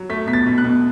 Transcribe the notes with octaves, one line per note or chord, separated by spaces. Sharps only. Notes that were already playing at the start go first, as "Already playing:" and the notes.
Already playing: F#3
A3 B6
B2 B6
A6
B2
F#6
B2